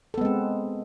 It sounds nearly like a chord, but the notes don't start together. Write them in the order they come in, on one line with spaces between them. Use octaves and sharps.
A4 B3 G#3 C4